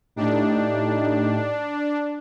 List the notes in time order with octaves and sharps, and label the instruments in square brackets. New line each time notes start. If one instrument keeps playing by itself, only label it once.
[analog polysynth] A2 A3 D#4 G4 [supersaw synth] D4